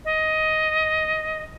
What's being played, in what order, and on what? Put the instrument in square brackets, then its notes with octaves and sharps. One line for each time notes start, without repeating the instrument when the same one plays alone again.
[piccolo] D#5